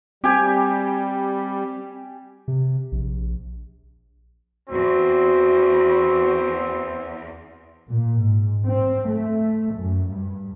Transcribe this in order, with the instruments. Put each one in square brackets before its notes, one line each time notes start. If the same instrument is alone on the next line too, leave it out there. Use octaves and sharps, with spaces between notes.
[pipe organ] G3 [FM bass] C4 [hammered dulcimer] G4 G#5
[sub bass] C3
A#1
[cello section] E2 [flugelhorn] C4 [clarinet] F#4
[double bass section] A#2
G#2
C4
A3
F#2
G2